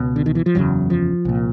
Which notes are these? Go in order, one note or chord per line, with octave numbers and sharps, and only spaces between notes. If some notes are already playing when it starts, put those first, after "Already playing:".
Already playing: C#2 B2
D3
D#3
E3
F3
F#1 E2 C#3 F#3
F3
C2 A#2